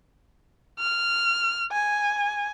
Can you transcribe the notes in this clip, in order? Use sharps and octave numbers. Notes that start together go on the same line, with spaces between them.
F6
G#5